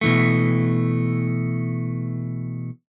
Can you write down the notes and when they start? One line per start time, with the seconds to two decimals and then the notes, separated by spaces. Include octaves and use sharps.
0.01 B2 E3 A3